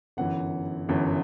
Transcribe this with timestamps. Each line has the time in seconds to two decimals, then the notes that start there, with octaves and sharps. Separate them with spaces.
0.17 G1 F#2 E3 F#5
0.89 G1 F#2 E3